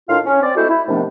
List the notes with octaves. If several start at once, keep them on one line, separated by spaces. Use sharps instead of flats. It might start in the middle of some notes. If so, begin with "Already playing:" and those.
A2 D#3 D4 F4 F5
C#4
C4 D5
G#3 A3 E4 F#4 A4 C5
E4
C3 D#3 F3 A3 B3 D4